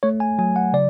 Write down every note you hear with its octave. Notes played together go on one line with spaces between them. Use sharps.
A3 C#5
G#5
F#3 G#5
F#5
C#3 D5